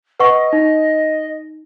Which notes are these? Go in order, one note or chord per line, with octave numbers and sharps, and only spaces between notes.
B4 D#5 F#5 C#6
D#4